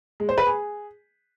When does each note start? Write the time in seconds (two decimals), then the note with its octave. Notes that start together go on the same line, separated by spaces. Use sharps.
0.20 G#3
0.29 C5
0.38 B4
0.46 G#4